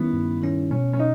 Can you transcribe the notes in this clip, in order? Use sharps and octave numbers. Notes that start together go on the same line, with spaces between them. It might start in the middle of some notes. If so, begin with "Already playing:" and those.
Already playing: D#3 G3 B3 C#4 E4
G2
D#3 G3 C#4 E4
B2 C#4
C#4
D#4